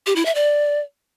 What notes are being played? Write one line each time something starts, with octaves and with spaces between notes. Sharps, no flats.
G4
E4
E5
D5